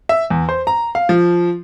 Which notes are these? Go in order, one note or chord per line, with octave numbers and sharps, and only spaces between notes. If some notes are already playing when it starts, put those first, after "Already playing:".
E5
E2
C5
A#5
F5
F3